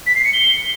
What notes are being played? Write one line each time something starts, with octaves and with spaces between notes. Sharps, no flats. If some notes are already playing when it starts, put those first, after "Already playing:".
B6
C7
C#7
G7